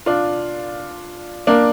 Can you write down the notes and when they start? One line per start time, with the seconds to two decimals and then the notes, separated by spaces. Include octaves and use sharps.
0.06 D4 F4
1.47 A#3 D4